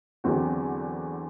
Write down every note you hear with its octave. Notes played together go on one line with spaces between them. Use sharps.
E2 D3 F#3 C4 F#4